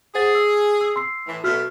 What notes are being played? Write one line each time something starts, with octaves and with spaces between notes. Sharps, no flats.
G#4 C5 F#5 A6
E6
E6
C6 E6 C7
A2 E3
B2 F#3 A3 F#4 F6